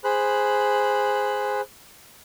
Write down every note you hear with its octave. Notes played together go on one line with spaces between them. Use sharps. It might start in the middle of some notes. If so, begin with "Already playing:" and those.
G#4 C5 B5 F#6